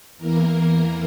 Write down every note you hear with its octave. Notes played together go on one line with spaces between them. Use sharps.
E2 E3 A#3 A#4